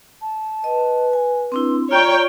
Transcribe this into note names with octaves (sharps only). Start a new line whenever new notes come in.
A5
B4 D#5
G#5
C4 D4 E4 C6
F4 C#5 D5 G5 A#5